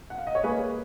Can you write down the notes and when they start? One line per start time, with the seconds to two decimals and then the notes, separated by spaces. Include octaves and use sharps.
0.10 F#5
0.18 F5
0.27 D#5
0.35 C#5
0.43 A#3 G#4 B4